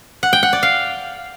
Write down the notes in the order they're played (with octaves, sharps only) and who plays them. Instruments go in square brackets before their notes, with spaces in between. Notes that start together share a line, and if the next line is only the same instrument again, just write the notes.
[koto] F#5
G5
F#5
D5
F5